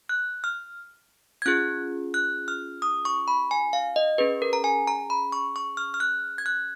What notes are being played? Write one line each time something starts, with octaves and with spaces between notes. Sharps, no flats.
F#6
F6
G#6
C#4 F4 G#4 F#6
F#6
F6
D#6
C#6
B5
G#5
F5
D#5
C#4 G#4 B4
A#4
A#5
G#5
A#5
B5
C#6
C#6
F6
F6
F#6
G#6
F#6